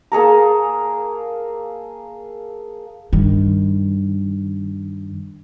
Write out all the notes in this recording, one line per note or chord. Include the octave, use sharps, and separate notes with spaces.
A#3 G#4 A4 A#5
G2 D#3